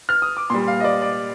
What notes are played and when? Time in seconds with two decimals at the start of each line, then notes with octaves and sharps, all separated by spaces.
0.09 F6
0.22 D#6
0.37 D6
0.50 A#2 G3 C6
0.67 F5
0.80 D#5
0.84 D5
1.02 D5